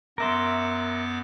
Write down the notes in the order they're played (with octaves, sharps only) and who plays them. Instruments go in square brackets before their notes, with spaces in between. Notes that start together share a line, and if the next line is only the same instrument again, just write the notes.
[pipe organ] F#2 B3 D6 [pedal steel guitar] A#4 E5 C6